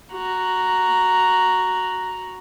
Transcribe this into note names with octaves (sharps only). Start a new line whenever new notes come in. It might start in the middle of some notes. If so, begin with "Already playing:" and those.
F#4 A#5